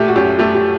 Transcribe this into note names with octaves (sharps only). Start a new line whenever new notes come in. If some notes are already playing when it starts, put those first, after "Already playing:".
Already playing: A#2 A3 G4
F#4
F#2 G4
A3 G4
G4